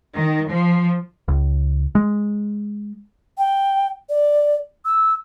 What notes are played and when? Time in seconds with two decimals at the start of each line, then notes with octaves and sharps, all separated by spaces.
0.17 D#3
0.51 F3
1.28 C#2
1.95 G#3
3.38 G5
4.10 D5
4.86 E6